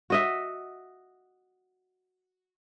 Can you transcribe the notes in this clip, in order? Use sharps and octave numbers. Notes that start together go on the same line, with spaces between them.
F#4 D#5 E5